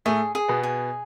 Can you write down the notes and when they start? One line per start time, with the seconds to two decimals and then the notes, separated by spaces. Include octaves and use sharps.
0.05 A2 A3 G#4
0.35 G#4
0.48 B2 B3
0.63 G#4